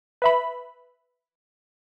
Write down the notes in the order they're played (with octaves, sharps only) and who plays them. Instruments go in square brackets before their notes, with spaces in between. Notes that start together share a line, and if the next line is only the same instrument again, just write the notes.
[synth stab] B4 E5 B5